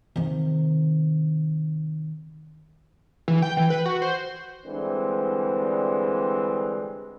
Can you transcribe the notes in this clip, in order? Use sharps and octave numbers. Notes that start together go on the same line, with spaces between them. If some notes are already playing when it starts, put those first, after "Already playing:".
C3 D#3
E3
G5
E3
B4
F#4
C5
D3 E3 G3 G#3 C4